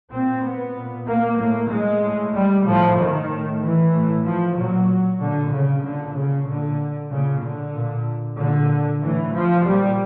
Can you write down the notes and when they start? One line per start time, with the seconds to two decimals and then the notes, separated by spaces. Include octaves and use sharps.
0.11 A#2 C4
0.43 B3
0.75 A#2
1.07 A#3
1.38 A2 A#3
1.70 G#3
2.02 A2
2.34 G3
2.66 A2 F3
2.98 D#3
3.29 A2
3.61 E3
3.92 A2
4.25 F3
4.56 A#2 F#3
5.20 A#2 D3
5.52 C#3
5.83 A#2 D3
6.15 C#3
6.47 A#2 D3
7.10 A#2 C#3
7.42 D3
7.74 A#2
8.37 A#2 D3
9.01 A2 E3
9.33 F3
9.65 A#2 G3